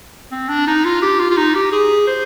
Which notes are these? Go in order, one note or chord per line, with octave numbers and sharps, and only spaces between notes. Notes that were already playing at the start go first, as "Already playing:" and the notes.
C4
D4
D#4
F4
G4
F4
F4
D#4
G4
G#4
C5